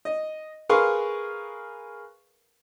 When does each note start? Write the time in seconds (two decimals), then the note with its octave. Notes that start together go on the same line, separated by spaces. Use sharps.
0.05 D#5
0.69 G#4 A#4 B4 F5 C6 C#6